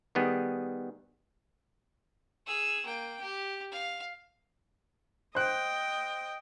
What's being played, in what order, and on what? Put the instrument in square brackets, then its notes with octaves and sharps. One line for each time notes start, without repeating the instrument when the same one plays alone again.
[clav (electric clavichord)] D#3 G3 B3 G#4
[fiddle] G#4 E6
A#3 G5
G4
F5
[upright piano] C5 F#6 [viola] D#5 G5